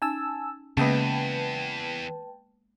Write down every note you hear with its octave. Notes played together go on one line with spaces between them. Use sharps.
C#4 D#4 G#5 A5 E6
E2 C#3 G#3 A#3 B3 B4 G5 A5